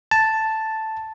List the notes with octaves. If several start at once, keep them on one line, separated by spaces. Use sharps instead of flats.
A5